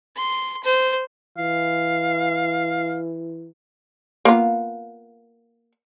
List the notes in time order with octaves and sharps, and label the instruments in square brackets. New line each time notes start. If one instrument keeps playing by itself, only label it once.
[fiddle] C6
C5
[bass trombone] E3 [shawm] F5
[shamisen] A#3 B3 F4